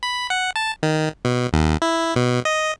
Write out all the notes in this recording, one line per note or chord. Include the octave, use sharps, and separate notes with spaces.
B5
F#5
A5
D#3
B2
D#2
E4
B2
D#5